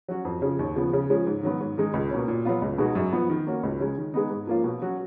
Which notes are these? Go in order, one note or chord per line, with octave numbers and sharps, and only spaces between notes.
F#3 C#4 F#4
F2
C#3 F3
D#2
C#3 F3 B3
C#3
F3 G#3 C#4
G#2
D#3 F#3 B3
G#2
D#3 G#3 D#4
C#2
B2 A#3 C#4
A#2
F#3 B3 F4
C#2
B2 G#3 D#4 F#4
F#2
F3 B3
D#3
A#3 C#4 F#4
C#2
C#3 G#3
D#3
G#3 B3 D#4
G#2
F3 A#3 C#4 F4
B2
F#3 C#4 F#4